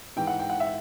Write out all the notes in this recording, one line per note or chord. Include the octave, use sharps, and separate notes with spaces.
G#2 E3 G5
F#5
G5
F#5
E5